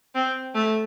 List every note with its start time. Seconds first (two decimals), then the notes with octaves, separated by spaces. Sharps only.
0.15 C4
0.55 A3